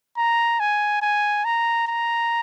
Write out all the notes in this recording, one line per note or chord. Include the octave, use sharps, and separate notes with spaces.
A#5
G#5
G#5
A#5
A#5